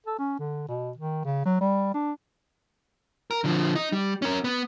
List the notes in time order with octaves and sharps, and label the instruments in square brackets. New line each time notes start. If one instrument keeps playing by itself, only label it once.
[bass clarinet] A4
C#4
D3
B2
D#3
C#3
F#3
G3
D4
[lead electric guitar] A#4
D3 F3
D#4
G3
C#4 A#4
B3